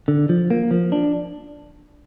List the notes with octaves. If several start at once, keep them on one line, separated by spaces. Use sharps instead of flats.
D3
F3
A#3
F3
D4